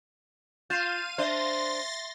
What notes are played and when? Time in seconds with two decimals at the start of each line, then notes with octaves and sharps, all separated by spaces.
0.70 F4 F5 G6 A6 D#7 E7
1.18 D4 C5 E5 C6 A6 A#6